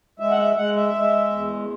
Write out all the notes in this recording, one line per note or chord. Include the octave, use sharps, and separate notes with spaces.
G#3 E5
F#5
E5
G#3 F#5
E5
G#3
E2